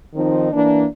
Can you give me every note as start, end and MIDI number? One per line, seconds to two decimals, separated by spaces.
0.15 0.49 51
0.15 0.49 53
0.15 0.49 60
0.15 0.49 63
0.52 0.84 52
0.52 0.84 58
0.52 0.84 62